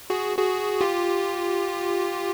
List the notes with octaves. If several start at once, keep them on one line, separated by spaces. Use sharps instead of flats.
F#4 G#4
F#4 G#4
F4 G4